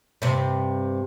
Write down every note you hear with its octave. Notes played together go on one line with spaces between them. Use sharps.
G2 C3